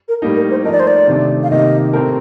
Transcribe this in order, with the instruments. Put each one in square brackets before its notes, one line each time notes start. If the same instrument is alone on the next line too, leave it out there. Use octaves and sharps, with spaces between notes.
[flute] A#4
[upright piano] A2 G3 A#3 D#4
[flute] A#4
C5
[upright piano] F3 A3 D#4 A#4 [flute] D#5
[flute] D5
C5
D5
[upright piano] C3 D#3 A3 D4
[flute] F5
[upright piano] C3 D#3 A#3 [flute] D#5
[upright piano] A2 A3 C4 G4 A#4